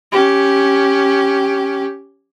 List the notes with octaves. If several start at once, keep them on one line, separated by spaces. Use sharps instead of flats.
C#4 G4